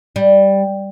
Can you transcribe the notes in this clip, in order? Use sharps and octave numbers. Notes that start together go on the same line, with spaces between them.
G3